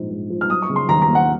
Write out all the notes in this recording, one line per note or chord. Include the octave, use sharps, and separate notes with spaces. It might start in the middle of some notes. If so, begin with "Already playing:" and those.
Already playing: A#1 G#2
G#2
F3
F6
F#3 D#6
C#6
C#3
C6
D#2 A#5
A#5
A#3
F#5